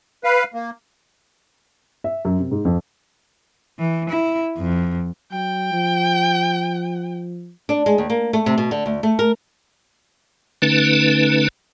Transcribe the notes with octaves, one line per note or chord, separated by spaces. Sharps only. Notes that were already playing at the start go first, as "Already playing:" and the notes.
B4 F5
A#3
E5
F#2
C3
G#2
F2
E3
E4
F2
F#3 G5
F3
D4
G#3
D#2
A#3
A3
C3
B2
D3
D2
A3
A#4
D3 A3 C#4 D#4 B4